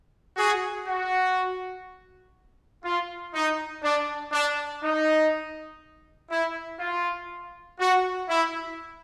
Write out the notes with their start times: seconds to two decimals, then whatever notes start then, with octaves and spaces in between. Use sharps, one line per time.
0.37 F#4 G#4
0.86 F#4
2.84 F4
3.34 D#4
3.83 D4
4.32 D4
4.83 D#4
6.30 E4
6.80 F4
7.79 F#4
8.29 E4